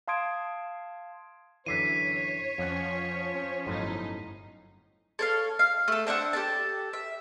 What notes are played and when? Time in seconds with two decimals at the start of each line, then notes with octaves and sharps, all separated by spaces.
0.08 F5 A5 C6 D#6 G#6 D7
1.66 F#2 D3 E3 C#5 B6 C7 D#7
2.58 F2 F3 C#4 F#5
3.66 G1 F#2 A2 D#4 C5
5.19 A4 C#5 F5
5.59 F5
5.88 A3 A4
6.07 C4 D4 E5 F#5
6.33 G4 A4 A5
6.93 E5